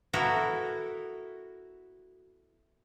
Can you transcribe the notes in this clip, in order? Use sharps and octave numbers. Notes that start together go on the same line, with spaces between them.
B3 E4 F#4 A4 A#4